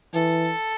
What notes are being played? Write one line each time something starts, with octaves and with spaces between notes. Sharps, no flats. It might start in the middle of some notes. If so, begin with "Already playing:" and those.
E3 A4